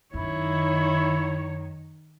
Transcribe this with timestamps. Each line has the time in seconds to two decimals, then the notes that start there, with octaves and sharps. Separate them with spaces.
0.14 F#2 D#3 E4 C#5